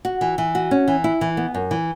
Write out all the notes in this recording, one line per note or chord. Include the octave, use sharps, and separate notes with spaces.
F#4
E3
E3
F#4
C#4
E3
E4
E3
B3
F#2
E3